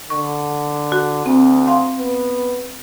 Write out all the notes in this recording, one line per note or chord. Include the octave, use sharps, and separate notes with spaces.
D3 C#6
F#4
D2 C4
F5 C6
B3